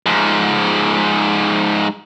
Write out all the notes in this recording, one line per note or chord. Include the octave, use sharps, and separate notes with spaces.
G#2 F3